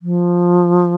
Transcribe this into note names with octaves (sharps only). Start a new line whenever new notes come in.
F3